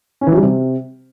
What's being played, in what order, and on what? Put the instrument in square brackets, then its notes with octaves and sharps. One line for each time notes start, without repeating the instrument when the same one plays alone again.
[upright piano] C#4
E3
F#3
G3
C3